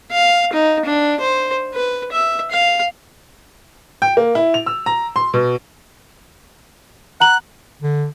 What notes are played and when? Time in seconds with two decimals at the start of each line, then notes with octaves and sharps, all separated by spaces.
0.11 F5
0.53 D#4
0.85 D4
1.20 C5
1.74 B4
2.12 E5
2.51 F5
4.02 G5
4.17 A#3
4.35 E4
4.54 F7
4.66 E6
4.86 A#5
5.16 C6
5.34 B2
7.20 F#5 A#5 F#6 F#7
7.83 D3